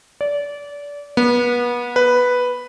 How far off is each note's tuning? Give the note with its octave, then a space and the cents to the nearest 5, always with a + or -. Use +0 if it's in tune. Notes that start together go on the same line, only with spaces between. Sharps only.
D5 -25
B3 -30
B4 +0